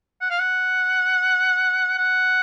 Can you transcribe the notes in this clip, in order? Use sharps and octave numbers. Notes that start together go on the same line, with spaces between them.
F#5
F5
F#5
F#5